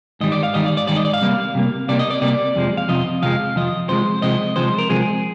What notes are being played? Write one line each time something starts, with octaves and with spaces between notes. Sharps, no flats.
G#2 D#3 G3 D#5
D5
F5
G#2 D#3 G3 D#5
D5
D5
G#2 D#3 G3 D5
D#5
D5
F5
C3 G3 A#3
C3 G3 A#3
C3 G3 A#3 D5
D#5
D5
C3 G3 A#3 D5
F2 C3 F3 G#3
F5
F2 C3 F3 D#5
F2 C3 F3 G#3 F5
F2 C3 F3 D#5
C3 F3 G#3 C5
C3 F3 G#3 D#5
C3 F3 G#3 C5
A#4
C3 F3 G#3 G#4